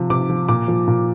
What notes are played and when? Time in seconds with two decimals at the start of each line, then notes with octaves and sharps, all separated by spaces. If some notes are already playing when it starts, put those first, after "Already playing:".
Already playing: C3 F3
0.10 C3 D6
0.30 F3
0.49 A#2 D6
0.68 F3
0.88 A#2